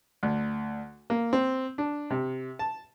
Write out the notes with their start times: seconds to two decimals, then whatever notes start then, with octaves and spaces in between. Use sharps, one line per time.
0.23 D2
1.10 A#3
1.33 C4
1.78 D4
2.10 C3
2.59 A5